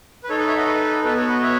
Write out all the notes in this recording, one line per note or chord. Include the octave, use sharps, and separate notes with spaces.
B4
D#4 A4 C#5
B4 D#5
C#5 E5
D#5 F#5
B4
B3 F#4 A4 B4
A4 C#5
B4 D#5
C#5 E5